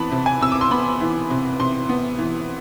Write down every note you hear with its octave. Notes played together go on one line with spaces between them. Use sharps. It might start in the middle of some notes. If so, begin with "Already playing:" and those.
Already playing: C3 E3 B3 A5 B5
C3
G#5
C3 E6
D6
C6
B3 B5
E3
C3
C3 C6
B3
E3